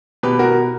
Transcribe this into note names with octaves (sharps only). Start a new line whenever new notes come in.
B2 G4 B4
B2 F#4 A#4